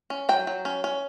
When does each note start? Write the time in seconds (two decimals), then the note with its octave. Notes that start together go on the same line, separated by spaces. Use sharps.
0.10 C#4
0.29 F#3 G5
0.47 F#3
0.65 C#4
0.84 C#4